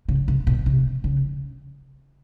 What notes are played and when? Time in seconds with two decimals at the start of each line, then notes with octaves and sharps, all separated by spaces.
0.09 C#3
0.28 C3
0.47 B2
0.66 C3
1.04 C#3